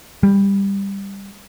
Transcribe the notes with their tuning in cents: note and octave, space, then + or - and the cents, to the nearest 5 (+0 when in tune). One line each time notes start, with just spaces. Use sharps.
G3 +15